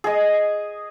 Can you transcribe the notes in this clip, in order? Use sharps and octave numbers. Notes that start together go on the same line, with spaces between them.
G#4 D#5